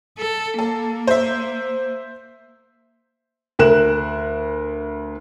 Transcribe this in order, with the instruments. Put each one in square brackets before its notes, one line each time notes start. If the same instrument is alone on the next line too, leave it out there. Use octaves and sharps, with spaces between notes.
[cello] A4
[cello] A#3 [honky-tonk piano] A4
[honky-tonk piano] C5 E5
[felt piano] D2 A#4 F#6 E7